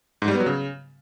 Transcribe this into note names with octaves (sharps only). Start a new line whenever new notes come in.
G#2
G3
B3
F#3
C#3